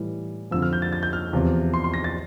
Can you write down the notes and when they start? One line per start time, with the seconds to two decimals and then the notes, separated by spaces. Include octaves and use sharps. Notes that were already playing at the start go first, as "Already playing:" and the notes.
Already playing: A2 E3 G3
0.51 F2 D3 F3 E6
0.62 F6
0.73 G6
0.82 A6
0.93 A6
1.03 G6
1.13 F6
1.33 E2 C3 F3
1.74 C6
1.84 C6
1.94 A#6
2.04 A6